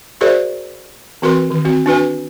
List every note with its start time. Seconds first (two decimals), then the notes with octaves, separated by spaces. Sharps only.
0.21 F#4 G#4 A#4 C5 D5 E5
1.22 E3 C4 F#4 A#4 B4 C6
1.50 D#3
1.65 C4 F#4
1.86 D4 F#4 B4 G#5